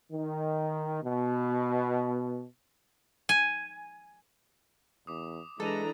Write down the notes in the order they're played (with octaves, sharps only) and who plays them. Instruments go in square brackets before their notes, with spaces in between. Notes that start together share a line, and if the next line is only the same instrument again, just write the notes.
[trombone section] D#3
B2
[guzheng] G#5
[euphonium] E2 [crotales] D6 D#6
[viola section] E3 D4 A#5 [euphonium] G#3 [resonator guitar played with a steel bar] A4 [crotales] A6 D#7